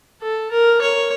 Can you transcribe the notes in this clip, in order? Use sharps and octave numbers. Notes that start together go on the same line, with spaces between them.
A4
A#4
C#5